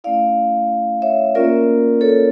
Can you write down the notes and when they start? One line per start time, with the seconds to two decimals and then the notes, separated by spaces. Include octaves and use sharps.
0.04 A3 C#4 E4 D5 F5
1.02 C#5 E5
1.35 A#3 C#4 F4 A#4 D5
2.01 A4 C#5